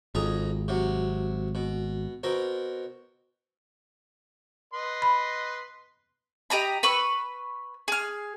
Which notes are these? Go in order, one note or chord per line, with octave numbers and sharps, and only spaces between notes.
G#1 F2 G#4 A#5
C3 F#3
B2
B2 C4 A#4
B4 D#5 C6
B5
G4 D#5 A#5 B5
B4 B5 C#6 E6
G#4 F6